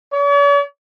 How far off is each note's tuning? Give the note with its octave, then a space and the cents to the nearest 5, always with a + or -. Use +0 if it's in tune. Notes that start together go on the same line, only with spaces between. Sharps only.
C#5 +45